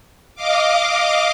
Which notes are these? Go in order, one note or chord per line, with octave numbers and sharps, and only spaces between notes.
D#5 F5 D6